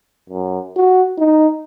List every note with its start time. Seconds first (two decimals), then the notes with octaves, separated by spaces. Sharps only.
0.30 F#2
0.76 F#4
1.18 D#4